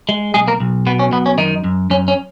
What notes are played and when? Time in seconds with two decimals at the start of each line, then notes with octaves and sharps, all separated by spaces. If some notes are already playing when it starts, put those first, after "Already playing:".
0.09 G#3
0.34 B1 G#3 G#4
0.48 A#3 A#4
0.60 B1
0.87 B2 B3
0.99 C#4
1.12 B1 B3
1.26 C#4
1.38 F#2 D#3 D#4
1.64 F#2
1.90 F#2 C#4
2.08 C#4